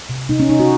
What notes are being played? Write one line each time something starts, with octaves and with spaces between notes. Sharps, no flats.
C3
C3 D#4
C#4
C3 D#4
F#4